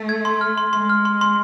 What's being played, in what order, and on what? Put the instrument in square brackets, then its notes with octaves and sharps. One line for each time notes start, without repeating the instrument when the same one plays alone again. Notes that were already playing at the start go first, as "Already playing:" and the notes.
Already playing: [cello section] A3
[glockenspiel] G#6
C6
F6
C6
[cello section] G#3 [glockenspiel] C6
[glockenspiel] F6
C6
C6